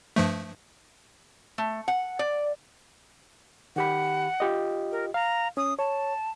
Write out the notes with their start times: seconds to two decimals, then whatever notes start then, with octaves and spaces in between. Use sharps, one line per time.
0.16 G2 F3 A3
1.58 A3
1.88 F#5
2.19 D5
3.76 D#3 G4 F#5 B5
4.40 F4 G4 D#5
4.92 A#4
5.14 F5 A#5
5.57 C#4 D#6
5.79 C#5 A5